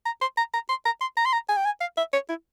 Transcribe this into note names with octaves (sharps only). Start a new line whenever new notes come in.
A#5
C6
A#5
A#5
C6
A#5
C6
A#5
C6
A#5
G#5
G5
G#5
F5
E5
C#5
E4